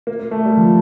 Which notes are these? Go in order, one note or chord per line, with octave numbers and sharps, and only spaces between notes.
A#3
A#3
A3
G3
F3